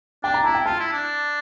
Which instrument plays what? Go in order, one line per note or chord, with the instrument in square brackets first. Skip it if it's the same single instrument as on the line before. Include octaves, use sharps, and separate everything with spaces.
[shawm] D4 [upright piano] G5
[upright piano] A#5
[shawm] E4 [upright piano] A5
[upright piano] G5
[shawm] F4 [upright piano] A5
[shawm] E4
D4